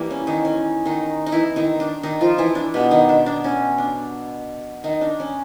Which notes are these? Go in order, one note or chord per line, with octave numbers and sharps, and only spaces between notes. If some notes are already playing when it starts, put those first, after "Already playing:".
Already playing: E3 G3 A#3
C#4
D#3 D#4
C#4
D#3 D#4
D#4
E3 E4
D#3 D#4
D4
D#3 D#4
F3 F4
E3 E4
D4
B2 G3 B3
D#3 D#4
D4
D4
C#4
D4
D#3 D#4
D4
C#4